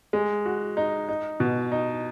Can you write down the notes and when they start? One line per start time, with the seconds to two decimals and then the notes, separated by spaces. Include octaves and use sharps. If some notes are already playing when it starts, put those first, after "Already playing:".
0.13 G#3
0.46 F#4
0.77 D#4
1.09 D#4
1.40 B2
1.72 D#4